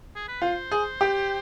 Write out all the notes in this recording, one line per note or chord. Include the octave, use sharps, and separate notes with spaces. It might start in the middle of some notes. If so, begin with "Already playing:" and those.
G#4
B4
F4 C5
G#4
G4